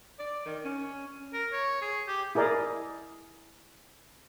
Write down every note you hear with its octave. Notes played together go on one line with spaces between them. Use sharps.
D5
D#3
C#4
A#4
C#5
G#4
G4
E4 G#4 A#4 D5 D#5